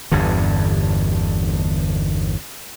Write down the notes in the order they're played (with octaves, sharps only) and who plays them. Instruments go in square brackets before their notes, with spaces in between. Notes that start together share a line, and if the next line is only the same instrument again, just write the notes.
[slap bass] G1 E2 G2 D3